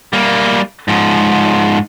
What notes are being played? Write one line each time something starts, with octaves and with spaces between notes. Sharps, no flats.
G3 A#3
G#2 F3